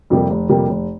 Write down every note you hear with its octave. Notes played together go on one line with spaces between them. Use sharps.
F2 C3 G3 A#3
F1
F2 C3 G3 A#3
F1